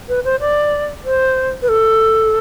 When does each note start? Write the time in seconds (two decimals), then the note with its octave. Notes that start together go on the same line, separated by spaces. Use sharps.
0.09 B4
0.25 C5
0.40 D5
1.05 C5
1.62 B4
1.69 A4